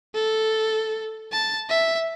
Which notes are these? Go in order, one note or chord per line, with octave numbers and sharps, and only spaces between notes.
A4
A5
E5